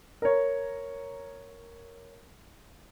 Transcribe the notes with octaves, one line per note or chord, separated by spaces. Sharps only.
A#4 C#5